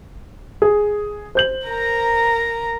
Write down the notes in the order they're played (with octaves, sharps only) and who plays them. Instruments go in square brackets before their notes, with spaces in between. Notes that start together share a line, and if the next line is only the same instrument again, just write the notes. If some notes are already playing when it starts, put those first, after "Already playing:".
[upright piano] G#4
C5 G6 F#7
[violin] A#4 A#5